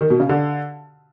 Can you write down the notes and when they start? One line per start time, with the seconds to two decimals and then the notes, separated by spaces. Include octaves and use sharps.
0.01 D#3
0.10 B2
0.20 C#3
0.29 D3